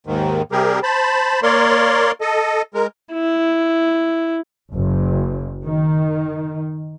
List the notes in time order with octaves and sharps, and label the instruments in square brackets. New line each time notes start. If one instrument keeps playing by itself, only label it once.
[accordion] D#2 G#2 D#3
C3 G3 G4 G#4 A#4
C5 A5 B5
A#3 A#4 C#5 D5 C6
A4 D#5
G#3 A#4
[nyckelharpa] E4
[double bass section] F#1
D#3